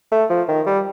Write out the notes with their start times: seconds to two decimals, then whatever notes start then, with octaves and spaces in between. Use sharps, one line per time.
0.12 A3
0.30 F3
0.48 D#3
0.66 G3